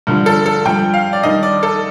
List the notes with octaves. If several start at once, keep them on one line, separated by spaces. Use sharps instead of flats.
G2 D3 F3
A4
A4
G2 F3 G5
F5
D5
G2 D#3 D#5
D5
A4